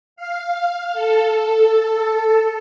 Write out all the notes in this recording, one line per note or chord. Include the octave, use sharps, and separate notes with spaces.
F5
A4
A4